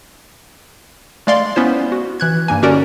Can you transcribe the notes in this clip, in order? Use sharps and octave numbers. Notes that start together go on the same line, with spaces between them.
G#3 A3 D5 F5 C6
B3 C#4 E4 C5
F#4
E3 F#6 G#6
G2 A#3 G#5
D3 C#4 F#4 G4 A#4 D5